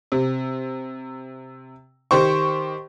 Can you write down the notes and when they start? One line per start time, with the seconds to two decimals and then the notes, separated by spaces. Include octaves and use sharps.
0.12 C3
2.11 D#3 G4 C5 C#6